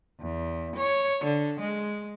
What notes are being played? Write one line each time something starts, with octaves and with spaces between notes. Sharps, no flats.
E2
C#5
D3
G#3